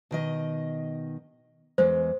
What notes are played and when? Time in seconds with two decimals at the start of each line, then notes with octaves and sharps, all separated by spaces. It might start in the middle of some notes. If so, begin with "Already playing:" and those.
0.11 B2 D#3 D#5
1.78 E2 G#3 C5